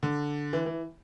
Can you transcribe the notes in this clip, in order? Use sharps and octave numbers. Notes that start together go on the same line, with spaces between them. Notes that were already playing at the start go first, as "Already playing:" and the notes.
D3
E3
E3